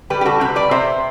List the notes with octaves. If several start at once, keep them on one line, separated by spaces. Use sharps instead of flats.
G3 G4 B4
G4
F#4 A4
C3 G4 B4
B4 D5
C3 C5 E5